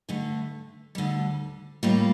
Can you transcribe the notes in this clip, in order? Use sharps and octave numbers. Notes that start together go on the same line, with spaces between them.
G2 D3 A3
D2 D3 G3
A2 G3 A#3 F4